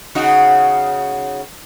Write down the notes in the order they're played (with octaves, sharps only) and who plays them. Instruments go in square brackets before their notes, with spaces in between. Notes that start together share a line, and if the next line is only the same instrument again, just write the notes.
[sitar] C#3 D#4 F#4